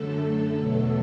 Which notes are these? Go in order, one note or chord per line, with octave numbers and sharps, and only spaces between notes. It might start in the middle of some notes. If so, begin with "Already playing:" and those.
Already playing: F#2 D3 A3 A4
A4
E2 B2 F#3 A3